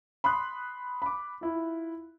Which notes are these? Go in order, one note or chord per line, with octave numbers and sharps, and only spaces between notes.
B5 C6 D#6 F#6
B5 D6
E4 F4